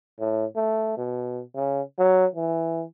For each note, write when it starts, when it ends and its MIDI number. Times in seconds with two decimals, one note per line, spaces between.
0.20 0.45 45
0.56 0.96 57
0.97 1.43 47
1.56 1.81 49
1.98 2.26 54
2.35 2.85 52